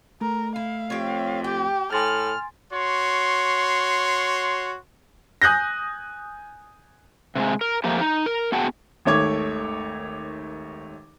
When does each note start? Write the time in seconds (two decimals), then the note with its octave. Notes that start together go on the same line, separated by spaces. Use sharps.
0.21 A3 A#4
0.56 E4 F5
0.90 F2 G4 C#5
1.44 G4 G5
1.93 A2 G#5 C6 F6 A6
2.72 F#4 C#5 C6
5.42 G#5 D#6 F#6 G6 A#6
7.36 C3 G3 G#3
7.61 A#4
7.84 F3 A3 A#3 G4
8.01 D#4
8.26 A#4
8.52 B3 F#4 G#4 F#5 G5 A5
9.05 G#1 D#2 A3 C#5 D6 G#6